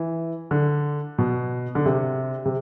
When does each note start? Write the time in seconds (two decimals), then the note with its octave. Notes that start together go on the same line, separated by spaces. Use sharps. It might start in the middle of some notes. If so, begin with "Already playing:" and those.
Already playing: E3
0.51 D3
1.18 B2
1.75 D3
1.86 C3
2.45 C3